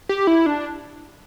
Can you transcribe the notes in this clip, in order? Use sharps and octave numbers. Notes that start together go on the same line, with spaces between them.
G4
E4
D4